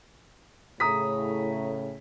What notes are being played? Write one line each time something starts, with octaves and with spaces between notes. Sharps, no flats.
A2 C#3 A#5 D#6 B6